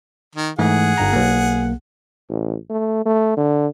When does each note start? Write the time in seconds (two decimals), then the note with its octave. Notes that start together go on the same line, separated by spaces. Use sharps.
0.35 D#3
0.59 G#2 E3 A3 G#4 F#5
0.98 G1 G2 A#5
1.13 B1 A#3
2.29 A1
2.70 A3
3.05 A3
3.37 D3